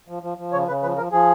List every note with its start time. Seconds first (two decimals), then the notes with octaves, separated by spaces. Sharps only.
0.08 F3
0.23 F3
0.38 F3
0.53 C#3 C#5
0.68 C#3 B4
0.82 F3 B4
0.97 F3 A#4
1.12 F3 G#4